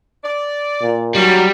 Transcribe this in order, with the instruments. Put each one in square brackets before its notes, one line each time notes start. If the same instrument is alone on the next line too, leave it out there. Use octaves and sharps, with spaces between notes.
[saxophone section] D5
[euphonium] A#2
[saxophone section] D#3 A#3 C#4 [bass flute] F#3 [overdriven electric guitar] G3